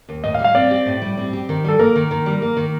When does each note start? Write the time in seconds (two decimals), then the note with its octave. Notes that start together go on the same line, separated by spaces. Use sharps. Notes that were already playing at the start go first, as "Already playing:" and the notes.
0.09 D#2
0.24 A2 D#5
0.34 F5
0.39 G3
0.44 F5
0.55 C4 D5
0.71 G4
0.86 A2
1.02 G3
1.17 C4
1.33 G4
1.49 D#3
1.64 G3 A4
1.79 A#3 A#4
1.96 D#3
2.11 D#3
2.26 G3
2.42 A#3
2.57 D#3